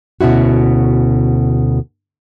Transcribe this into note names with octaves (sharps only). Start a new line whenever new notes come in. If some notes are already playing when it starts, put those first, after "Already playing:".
D2 B2 C#4 E4 F#4